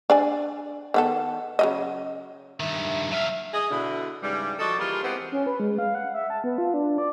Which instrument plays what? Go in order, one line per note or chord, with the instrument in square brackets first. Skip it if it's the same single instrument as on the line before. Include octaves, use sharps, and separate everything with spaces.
[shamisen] D4 D5 G#5
D#3 B3 A4
C#3 F#3 D#5
[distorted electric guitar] G2 D#3 [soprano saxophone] E5
[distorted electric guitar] F#3 F5 [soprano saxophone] E5
[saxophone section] G#4 D#5
B2 D3 E4
G#2 C#3 E3 G3
F3 F#4 A4 D5 D#5
E3 G3 A#3 F4 G4 G#4
E3 G#3 B3 C4 G4 G#4
[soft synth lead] C#4
B4
G#3
F5
F#5
E5
A5
B3
F4
D4
D5